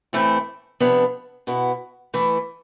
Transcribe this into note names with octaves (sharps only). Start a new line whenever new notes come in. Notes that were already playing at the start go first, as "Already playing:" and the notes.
A2 E3 A3 C4 E4
C3 F3 B3 D4
B2 B3 E4
E3 A3 E4